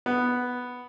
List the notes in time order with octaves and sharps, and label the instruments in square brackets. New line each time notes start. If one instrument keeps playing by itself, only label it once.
[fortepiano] B3